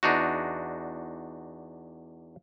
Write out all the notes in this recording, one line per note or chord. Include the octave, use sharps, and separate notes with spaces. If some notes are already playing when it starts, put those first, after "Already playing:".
E2 D4 D#4 F#4